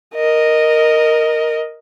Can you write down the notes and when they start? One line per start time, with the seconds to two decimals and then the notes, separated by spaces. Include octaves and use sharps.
0.15 A#4 D#5